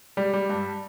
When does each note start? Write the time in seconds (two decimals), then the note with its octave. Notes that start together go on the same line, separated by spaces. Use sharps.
0.17 G3
0.34 G3
0.49 G2